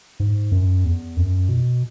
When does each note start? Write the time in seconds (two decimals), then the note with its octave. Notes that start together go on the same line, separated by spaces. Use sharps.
0.20 G#2
0.52 F#2
0.84 E2
1.17 F#2
1.49 B2